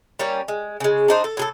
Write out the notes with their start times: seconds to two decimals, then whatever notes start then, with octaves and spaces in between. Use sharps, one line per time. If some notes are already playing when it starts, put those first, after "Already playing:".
0.19 G3 A#3 C#4
0.48 G#3
0.80 C#3 G#3
1.08 D4 D#4 C5
1.24 A4
1.37 A2 G#4 A4